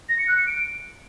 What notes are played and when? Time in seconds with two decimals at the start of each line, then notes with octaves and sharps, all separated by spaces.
0.09 A#6
0.19 C#7
0.28 F#6
0.38 C#7
0.47 D7